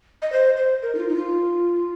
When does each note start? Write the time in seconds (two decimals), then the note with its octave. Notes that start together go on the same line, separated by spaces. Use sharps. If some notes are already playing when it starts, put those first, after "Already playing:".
0.22 D#5
0.32 C5
0.57 C5
0.82 A#4
0.95 D#4
0.98 F4
1.09 D#4
1.16 F4